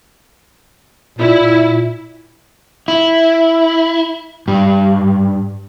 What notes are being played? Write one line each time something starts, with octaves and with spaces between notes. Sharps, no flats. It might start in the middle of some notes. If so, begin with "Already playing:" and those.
A#2 E4
E4
G2